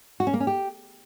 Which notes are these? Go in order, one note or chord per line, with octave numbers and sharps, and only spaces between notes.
F#4
C#4
A#3
C#4
G4